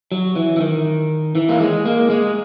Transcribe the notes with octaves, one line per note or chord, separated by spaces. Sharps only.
F#3
E3
E3
D#3
E3
A#3
G#3
A#3
G#3